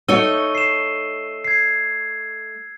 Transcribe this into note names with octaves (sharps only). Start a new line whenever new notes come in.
A3 D#4 C#5 E6 D#7 G7
C7 E7
G#6 C7